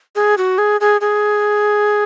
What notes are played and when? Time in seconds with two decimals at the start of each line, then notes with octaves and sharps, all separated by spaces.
0.16 G#4
0.38 F#4
0.58 G#4
0.81 G#4
1.01 G#4